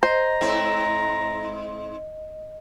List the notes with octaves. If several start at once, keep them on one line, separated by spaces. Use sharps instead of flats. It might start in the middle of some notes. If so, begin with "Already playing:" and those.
C5 D#5 A#5
G#2 C4 E4